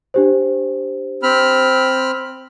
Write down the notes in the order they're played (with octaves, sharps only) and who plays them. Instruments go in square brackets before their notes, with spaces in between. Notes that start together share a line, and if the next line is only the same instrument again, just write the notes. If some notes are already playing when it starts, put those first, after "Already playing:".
[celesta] D4 G4 C5
[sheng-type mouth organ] C4 B5 F6